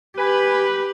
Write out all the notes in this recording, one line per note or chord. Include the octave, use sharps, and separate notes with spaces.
G4 B4 G#5 B5